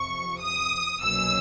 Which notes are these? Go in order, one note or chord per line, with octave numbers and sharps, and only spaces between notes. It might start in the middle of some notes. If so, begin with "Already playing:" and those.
Already playing: F2 C3 F3 C#6
D#6
C2 B2 F#3 A#3 C#4 E6